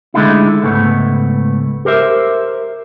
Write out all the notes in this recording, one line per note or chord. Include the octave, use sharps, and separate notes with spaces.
D3 G#3 A3 D#4 E4
C#2 G#2 A3 B3
G4 A#4 C5 E5